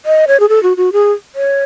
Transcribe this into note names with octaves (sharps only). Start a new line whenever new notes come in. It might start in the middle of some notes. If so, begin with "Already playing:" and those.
D#5
C#5
G#4
A4
F#4
F#4
G#4
C#5